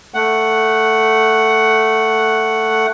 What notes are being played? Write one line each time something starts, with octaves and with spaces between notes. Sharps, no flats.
A3 F#5